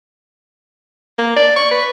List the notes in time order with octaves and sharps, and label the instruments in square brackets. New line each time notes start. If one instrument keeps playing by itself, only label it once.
[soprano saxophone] A#3
D5
C#6
B4